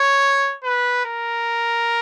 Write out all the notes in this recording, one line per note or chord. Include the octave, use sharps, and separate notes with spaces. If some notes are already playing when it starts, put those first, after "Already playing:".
Already playing: C#5
B4
A#4